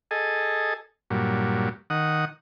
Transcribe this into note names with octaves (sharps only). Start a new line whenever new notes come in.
G#4 A4 D#5
G2 A#2 F#3
D#3 F#5 D#6